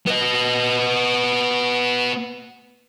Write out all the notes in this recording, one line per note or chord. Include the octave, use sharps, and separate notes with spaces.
B3 D#5